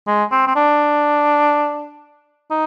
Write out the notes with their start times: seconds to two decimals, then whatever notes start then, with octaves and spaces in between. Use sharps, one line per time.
0.07 G#3
0.32 C4
0.47 C4
0.56 D4
2.51 D#4